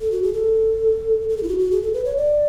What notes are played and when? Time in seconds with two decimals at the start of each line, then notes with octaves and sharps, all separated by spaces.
0.01 A4
0.12 F#4
0.23 G#4
0.34 A4
1.29 A4
1.37 G#4
1.43 E4
1.48 F#4
1.59 F#4
1.71 G#4
1.83 A4
1.93 B4
2.05 C#5
2.17 D5